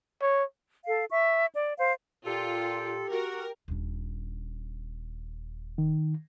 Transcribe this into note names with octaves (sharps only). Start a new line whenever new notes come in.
C#5
A4 F5
E5 C#6
D5
C5 F5
A#2 F4 G4 A4 G5 C6
F#4 A#4
D#1 D4
D#3